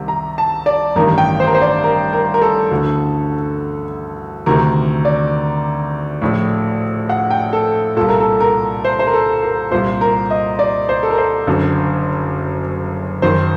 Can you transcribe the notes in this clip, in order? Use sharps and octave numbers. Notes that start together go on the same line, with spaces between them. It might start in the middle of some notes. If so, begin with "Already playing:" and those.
Already playing: C2 C3 D#3
A#5
A5
D5
A1 G2 D#3 A#4
G5
C5
A#4
C5
D5
A#4
A#4
A#4
A4
D2 D3
D2 C3 D#3 A#4
D5
A#1 A2
F#5
G5
A4
C2 A#2 A4
A#4
A4
A#4
C5
C5
A#4
A4
A#4
C2 A#2 C5
A#4
D#5
D5
C5
A4
A#4
C5
F#1 F#2 D3
F#1 F#2 D#3 C5